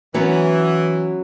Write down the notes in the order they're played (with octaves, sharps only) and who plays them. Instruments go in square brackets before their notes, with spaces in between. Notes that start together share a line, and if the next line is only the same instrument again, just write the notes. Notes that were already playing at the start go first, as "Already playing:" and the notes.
[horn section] E3 [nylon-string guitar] F#3 B3 C#4